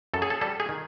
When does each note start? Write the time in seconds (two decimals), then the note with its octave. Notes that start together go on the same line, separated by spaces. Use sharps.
0.14 F#2 A4
0.22 G#4
0.30 A4
0.41 G3 A4
0.60 G#4
0.69 D#3